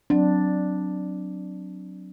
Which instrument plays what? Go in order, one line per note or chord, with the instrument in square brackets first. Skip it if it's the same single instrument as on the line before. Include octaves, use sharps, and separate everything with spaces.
[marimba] F#3 C4 [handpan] D4